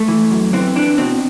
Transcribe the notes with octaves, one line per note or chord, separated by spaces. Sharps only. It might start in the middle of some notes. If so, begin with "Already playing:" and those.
Already playing: A3
E3
F#2
E3 C4
E3 D4
B2 C4